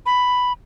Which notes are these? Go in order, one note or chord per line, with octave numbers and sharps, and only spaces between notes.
B5